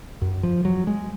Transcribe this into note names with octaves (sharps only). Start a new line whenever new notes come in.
F#2
F3
F#3
G#3